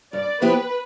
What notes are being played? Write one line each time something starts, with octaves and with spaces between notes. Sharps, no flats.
G2 D5
F3 B3 E4 G4 B4